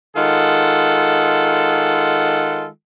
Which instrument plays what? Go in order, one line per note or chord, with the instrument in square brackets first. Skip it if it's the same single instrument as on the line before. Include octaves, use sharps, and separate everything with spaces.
[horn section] D#3 G#3 F4 A4 F#5